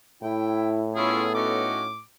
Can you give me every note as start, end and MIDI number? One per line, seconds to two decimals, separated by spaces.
0.23 2.03 45
0.23 0.84 64
0.23 0.71 79
0.95 1.69 59
0.95 1.24 61
0.95 1.24 64
0.95 1.24 65
0.95 1.30 68
0.95 1.69 69
1.35 1.85 61
1.35 1.85 63
1.35 1.85 66
1.35 2.02 86